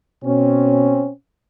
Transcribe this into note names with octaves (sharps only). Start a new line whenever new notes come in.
B2 C4 C#4